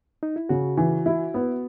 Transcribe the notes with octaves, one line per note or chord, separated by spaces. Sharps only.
D#4
E4
C#3 F#4
E3
E4
B3